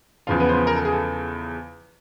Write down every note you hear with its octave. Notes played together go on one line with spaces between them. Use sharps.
E2 C#3 F3 F4 F5
B3 B4
C5
B3 B4
A#4
A4
G#4
A4